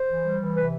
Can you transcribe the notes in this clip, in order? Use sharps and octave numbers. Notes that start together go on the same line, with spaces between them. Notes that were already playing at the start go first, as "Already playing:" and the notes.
Already playing: C5
E3
G3
E3
C3 B4